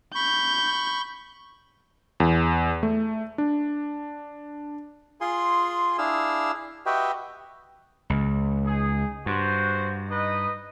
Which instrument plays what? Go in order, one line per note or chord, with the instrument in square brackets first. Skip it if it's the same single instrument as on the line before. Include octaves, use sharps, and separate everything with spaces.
[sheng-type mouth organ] B5 C#6 [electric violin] G6
[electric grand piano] E2
A3
D4
[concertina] F4 G#4 G#5 C6
D4 E4 G#4 F5 E6
F#4 G4 B4 D#5 E5 G5
[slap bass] C#2
[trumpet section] D#4 G#4
[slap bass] G2 [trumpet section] F#4 C5
[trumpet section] D#4 B4 D#5